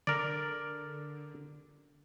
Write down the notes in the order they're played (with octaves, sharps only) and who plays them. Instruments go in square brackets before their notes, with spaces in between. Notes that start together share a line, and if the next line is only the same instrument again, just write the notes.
[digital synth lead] D3 [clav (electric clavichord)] A#4 D5